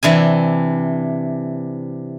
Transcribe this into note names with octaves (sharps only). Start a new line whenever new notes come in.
C3 E3 D4 G#5